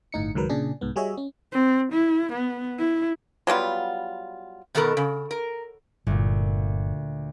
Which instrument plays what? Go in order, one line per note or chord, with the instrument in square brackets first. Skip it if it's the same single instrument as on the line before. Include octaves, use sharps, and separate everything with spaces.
[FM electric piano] G1 A2 D#4 C#7
C#2 G#2 D#3 F#3 A#4 B4
A#2 C#3 D4 G#4
C2 G#2 B3
G3 F#4 G#4 C#5 D#5 E5
C#4
[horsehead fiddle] C4
E4
B3
E4
[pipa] F#3 G3 B3 F4
[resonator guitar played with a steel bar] B2 D#3 B3 A4 A#4
C#3
A#4
[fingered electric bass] G1 [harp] D2 A#2